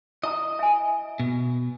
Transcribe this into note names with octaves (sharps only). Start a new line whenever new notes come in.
E4 D#5 A#5
E5 G#5
B2